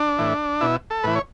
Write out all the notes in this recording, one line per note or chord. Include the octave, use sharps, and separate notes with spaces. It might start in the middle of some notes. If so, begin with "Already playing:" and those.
Already playing: D4
A2 E3
B2 E4
A4
A2 E3 B4
C#5